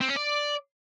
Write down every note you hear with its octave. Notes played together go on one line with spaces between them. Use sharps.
C4
C#4
D5